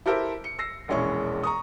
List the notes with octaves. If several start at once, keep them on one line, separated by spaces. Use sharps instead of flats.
E4 G4 A4 A#4 C5 E5
C#7
E6 A#6 C7
E1 A#1 G#3 C#4 E4 C#6
A#5 C#6 D#6